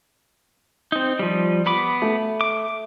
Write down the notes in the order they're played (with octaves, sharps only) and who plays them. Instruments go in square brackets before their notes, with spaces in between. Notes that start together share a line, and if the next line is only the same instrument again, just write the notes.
[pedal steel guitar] C4 D#4
F3 G3
B3 B5 D6
[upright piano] A3
[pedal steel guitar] D6